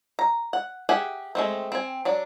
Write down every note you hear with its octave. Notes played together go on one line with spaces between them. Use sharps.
A#5
F#5
G4 G#4 E5 F#5 G#5
G#3 A3 C4
C4 G#5
F#3 D4 D5